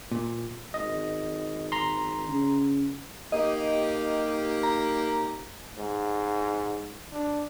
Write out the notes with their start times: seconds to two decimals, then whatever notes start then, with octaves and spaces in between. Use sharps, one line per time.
0.11 A#2
0.74 G#1 D#5
1.72 A#5 C6
2.28 C#3
3.32 A#3 D#4 G4 D#5
4.63 A#5
5.78 G#2
7.13 D4